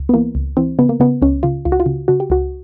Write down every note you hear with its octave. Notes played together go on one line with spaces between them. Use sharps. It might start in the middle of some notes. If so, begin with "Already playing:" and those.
Already playing: C#2
B3
E3 A#3
C#2
E3 C4
C#3 B3
A#3
C#3 B3
C#2 C#4
C#3 F4
C#2 F4
F#4
F4
C#3
C#3 F#4
G4
C#2 F#4